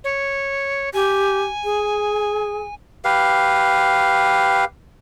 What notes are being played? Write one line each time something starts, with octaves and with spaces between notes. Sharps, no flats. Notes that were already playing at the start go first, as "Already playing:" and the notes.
C#5
G4 G#5
G#4
G4 B4 F5